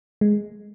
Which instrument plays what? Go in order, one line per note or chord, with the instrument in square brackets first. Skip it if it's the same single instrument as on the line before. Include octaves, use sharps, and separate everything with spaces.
[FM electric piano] G#3